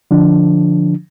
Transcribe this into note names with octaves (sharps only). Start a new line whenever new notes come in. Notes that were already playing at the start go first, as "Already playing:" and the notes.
D3 F3 D4